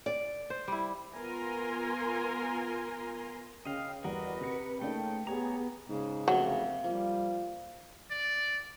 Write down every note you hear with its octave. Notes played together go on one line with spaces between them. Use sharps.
D5
C5
G3 E4
B3 F4 A#4 G#5 A#5 C6
C#3 D#5 F5 G5
E2 G3 F#4 A#4 B4 D#5 F#5
C3 C#7
C#3 A3 A#3 D#4 G5
B3 G4 G#4 C#5 A#5
G#2 C#3
F1 C3 F#3 A#3
F3 G3 A#3
D5